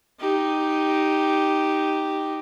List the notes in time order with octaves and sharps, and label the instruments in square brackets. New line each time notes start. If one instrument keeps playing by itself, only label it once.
[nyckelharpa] D#4 G4